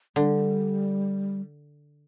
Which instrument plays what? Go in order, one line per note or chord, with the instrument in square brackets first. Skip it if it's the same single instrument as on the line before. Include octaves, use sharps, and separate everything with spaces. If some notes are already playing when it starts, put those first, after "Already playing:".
[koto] D3 [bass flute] G3